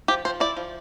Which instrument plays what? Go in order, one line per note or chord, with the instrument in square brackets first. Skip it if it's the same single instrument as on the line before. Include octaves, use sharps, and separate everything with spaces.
[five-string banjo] F3 G4
F3 C5
E4 D5
F3